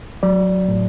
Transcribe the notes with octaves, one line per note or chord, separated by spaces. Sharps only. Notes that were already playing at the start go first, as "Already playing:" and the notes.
F#3 D5
A2